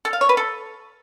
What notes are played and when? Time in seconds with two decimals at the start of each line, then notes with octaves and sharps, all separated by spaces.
0.05 A4
0.13 F5
0.21 C#5
0.29 B4
0.37 A4